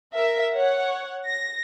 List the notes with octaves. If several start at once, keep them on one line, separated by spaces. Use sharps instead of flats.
A#4 E5
C#5 F#5
A#6